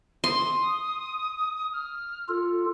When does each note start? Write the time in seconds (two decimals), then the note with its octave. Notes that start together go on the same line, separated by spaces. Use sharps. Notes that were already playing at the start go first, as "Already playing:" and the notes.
0.24 C6 D#6
1.73 F6
2.28 F4 A4